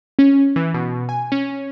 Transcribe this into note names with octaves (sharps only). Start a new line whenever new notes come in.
C#4
E3
B2
G#5
C#4